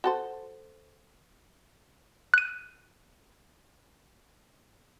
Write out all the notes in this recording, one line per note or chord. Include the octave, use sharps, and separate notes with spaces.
F#4 A4 C5
F#6 D#7